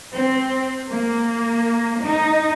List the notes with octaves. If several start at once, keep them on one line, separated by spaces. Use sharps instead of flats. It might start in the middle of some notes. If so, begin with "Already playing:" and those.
C4
A#3
D#4